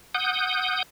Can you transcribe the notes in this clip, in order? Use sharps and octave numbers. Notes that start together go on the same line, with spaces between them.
F#5 D#6 G6